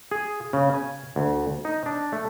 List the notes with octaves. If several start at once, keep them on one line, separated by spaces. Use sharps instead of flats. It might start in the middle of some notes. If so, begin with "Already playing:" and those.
G#4
C#3
G#5
D2
D#4
D4
A3